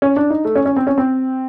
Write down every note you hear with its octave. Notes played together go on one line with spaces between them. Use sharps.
C#4
D4
D#4
A3
C#4
C#4
C4
C#4
C4